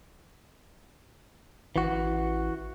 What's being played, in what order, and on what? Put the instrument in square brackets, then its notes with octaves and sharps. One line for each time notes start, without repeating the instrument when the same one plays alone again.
[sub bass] A1 [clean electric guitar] E3 F#4